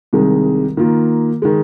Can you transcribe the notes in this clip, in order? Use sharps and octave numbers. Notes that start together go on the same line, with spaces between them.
C2 C3 D#3 G#3
D#3 A#3 F4
D#3 G#3